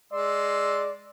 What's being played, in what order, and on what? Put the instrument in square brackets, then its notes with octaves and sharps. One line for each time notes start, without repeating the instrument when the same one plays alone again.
[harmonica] G#3 C6 E6 [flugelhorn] D5